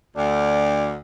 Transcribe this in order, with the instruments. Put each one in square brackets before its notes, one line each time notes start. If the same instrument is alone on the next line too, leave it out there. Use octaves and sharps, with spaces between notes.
[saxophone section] D2 [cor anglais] D5